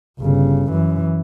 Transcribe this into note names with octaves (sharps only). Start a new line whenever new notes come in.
G1 C#3
F#2 E3